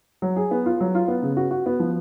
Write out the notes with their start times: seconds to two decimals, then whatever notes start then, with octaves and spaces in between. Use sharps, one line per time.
0.22 F#3
0.36 G#4
0.51 B3
0.66 F4
0.80 F#3
0.95 F4
1.08 B3
1.23 C#3
1.37 F#4
1.51 F#4
1.66 B3
1.80 F3